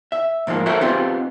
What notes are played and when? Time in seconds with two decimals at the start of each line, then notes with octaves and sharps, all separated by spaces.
0.12 E5
0.47 G#2 F3 G#3 A#3
0.66 F#4 A4 A#4 C5 E5
0.81 B3 C4 D#4 F4 G4 G#4